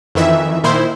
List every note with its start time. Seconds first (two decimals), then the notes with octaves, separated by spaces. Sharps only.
0.15 F2 D#3 E3 E5
0.64 A#2 D#3 E4 C5